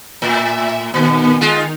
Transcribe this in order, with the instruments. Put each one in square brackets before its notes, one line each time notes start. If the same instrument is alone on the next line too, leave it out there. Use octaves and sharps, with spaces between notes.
[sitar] A2 [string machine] E5
[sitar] A#2 [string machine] D#3 B3
[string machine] D#3 D#4 [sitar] G#3 F4